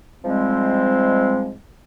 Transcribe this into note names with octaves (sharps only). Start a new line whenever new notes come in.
G#2 F3 G3 G#3 C4